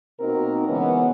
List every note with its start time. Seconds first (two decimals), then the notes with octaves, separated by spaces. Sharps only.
0.20 B2 A#3 C4 D#4 F#4 A#4
0.67 C#3 E3 G#3 B3 C#4